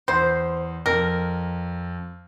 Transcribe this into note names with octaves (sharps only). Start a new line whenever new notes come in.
E2 C5 C6
F2 A#4